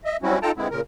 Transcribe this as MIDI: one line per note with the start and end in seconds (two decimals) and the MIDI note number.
0.05 0.17 75
0.05 0.17 76
0.23 0.39 54
0.23 0.39 55
0.23 0.39 60
0.23 0.39 61
0.23 0.39 64
0.23 0.39 66
0.42 0.51 63
0.42 0.51 65
0.42 0.51 69
0.42 0.51 79
0.42 0.51 81
0.42 0.51 82
0.57 0.68 50
0.57 0.68 56
0.57 0.68 59
0.57 0.68 60
0.57 0.68 64
0.70 0.81 46
0.70 0.81 49
0.70 0.81 70